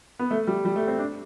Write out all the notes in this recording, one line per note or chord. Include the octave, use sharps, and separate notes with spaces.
B3
A3
G3
G3
A3
C4
D4